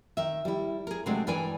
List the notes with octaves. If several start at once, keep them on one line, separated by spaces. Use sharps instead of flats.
D#3 E5
G3 E4
G#4 A#4
C3 F#3 G#3 A3 C4 D4
G2 E3 A#4 D5 G5 G#5